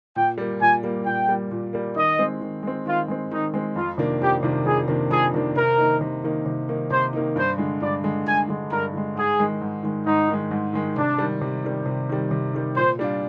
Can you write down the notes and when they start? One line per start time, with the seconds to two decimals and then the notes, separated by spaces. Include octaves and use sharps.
0.16 A#2 G5
0.38 G3 A#3
0.61 A#2 G#5
0.84 G3 A#3
1.05 A#2 G5
1.29 G3 A#3
1.51 A#2
1.73 G3 A#3
1.96 D#3 D#5
2.19 G#3 C4
2.41 D#3
2.63 G#3 C4
2.86 D#3 F4
3.08 G#3 C4
3.31 D#3 D#4
3.54 G#3 C4
3.76 F2 F4
3.98 C3 D#3 A#3 D4
4.21 F2 G4
4.43 C3 D#3 A#3 D4
4.65 F2 G#4
4.88 C3 D#3 A#3 D4
5.10 F2 G#4
5.34 C3 D#3 A#3 D4
5.55 C3 A#4
5.78 D#3 A#3 D#4
6.01 C3
6.24 D#3 A#3 D#4
6.46 C3
6.69 D#3 A#3 D#4
6.91 C3 C5
7.13 D#3 A#3 D#4
7.36 G2 C5
7.58 D3 G#3
7.81 G2 D5
8.04 D3 G#3
8.26 G2 G#5
8.49 D3 G#3
8.71 G2 A#4
8.93 D3 G#3
9.16 G#2 G#4
9.39 D#3 G#3
9.61 G#2
9.83 D#3 G#3
10.06 G#2 D#4
10.29 D#3 G#3
10.51 G#2
10.73 D#3 G#3
10.96 C3 D4
11.18 D#3 G3
11.41 C3
11.64 D#3 G3
11.86 C3
12.09 D#3 G3
12.31 C3
12.53 D#3 G3
12.76 A#2 C5
12.99 G3 D4 F4